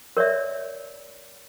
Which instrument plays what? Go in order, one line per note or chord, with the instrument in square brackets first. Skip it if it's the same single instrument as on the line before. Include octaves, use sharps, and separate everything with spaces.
[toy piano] A#4 C#5 D5 E5